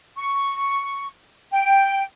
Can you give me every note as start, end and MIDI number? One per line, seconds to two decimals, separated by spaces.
0.16 1.06 85
1.51 2.03 79